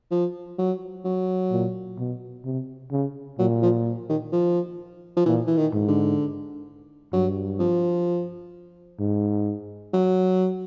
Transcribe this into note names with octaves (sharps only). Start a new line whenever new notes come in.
F3
F#3
F#3
A#2
B2
C3
C#3
A#2 F#3
F3
D#3
F3
F3
A#2 E3
E3
D#3
G#2
D3
G2 F#3
F3
G#2
F#3